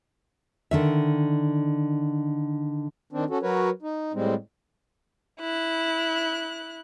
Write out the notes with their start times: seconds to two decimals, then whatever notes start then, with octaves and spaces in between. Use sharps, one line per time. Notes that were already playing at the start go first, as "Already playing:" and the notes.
0.71 D3 D#3 E5
3.12 D#3 C4 D4
3.30 C#4 F#4 A4
3.43 F#3 F#4 A#4 B4 C#5
3.82 D#4
4.13 A2 G3 G#3 C4
5.40 E4 F#6